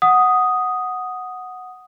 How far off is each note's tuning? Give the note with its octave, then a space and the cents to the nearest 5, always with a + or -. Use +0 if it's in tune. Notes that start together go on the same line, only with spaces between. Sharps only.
F#5 -5 D#6 +0